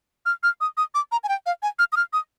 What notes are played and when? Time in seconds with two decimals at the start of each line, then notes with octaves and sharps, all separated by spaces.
0.26 F6
0.43 F6
0.61 D#6
0.77 D#6
0.95 D6
1.12 A#5
1.24 G#5
1.29 G5
1.46 F5
1.63 G#5
1.79 F6
1.92 D#6
1.97 F6
2.13 D#6